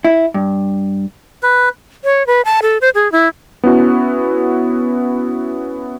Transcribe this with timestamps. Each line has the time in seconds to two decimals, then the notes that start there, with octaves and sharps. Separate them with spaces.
0.05 E4
0.34 G2
1.43 B4
2.04 C#5
2.27 B4
2.45 A5
2.62 A4
2.81 C5
2.95 G#4
3.12 E4
3.64 B3 C#4 E4 F#4